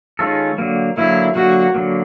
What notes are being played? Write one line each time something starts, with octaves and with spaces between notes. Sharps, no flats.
D#3 G#3 C#4 F4 A4
D3 F#3 A#3
D3 F#3 A#3 E4
D3 F#3 A#3 F#4
D3 F#3 A#3